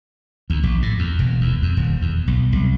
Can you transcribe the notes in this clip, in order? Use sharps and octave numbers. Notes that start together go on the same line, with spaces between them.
D2
A#1
A2
E2
E1
D#2
F2
D#1
E2
B1
C2